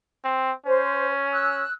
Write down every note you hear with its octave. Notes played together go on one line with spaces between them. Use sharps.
C4
C#4 C5
E6 F#6